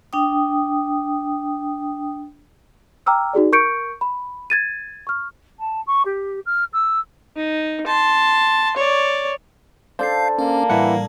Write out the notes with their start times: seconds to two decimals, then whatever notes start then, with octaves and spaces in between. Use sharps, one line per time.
0.13 D4 G5 D#6
3.06 G5 A#5 D6 E6 F6
3.33 D#4 F#4 G#4 D5
3.52 A#4 C#6 G6 C#7 D7
4.01 B5
4.50 G#6 A6 D#7
5.07 C#6 F6
5.59 A5
5.87 C#6
6.05 G4
6.46 F6
6.73 E6
7.37 D#4
7.87 A5 C6
8.77 C#5 D5
9.99 D4 A4 C5 F5 G6 C7
10.39 A#3 C#4
10.70 A2 E3 G3 E4 F#5